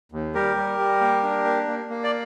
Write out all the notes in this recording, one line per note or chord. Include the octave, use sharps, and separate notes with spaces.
D#2
G3 G4 A#4
G3
G3
A#3
D4
A#3
A#3
A#3
D5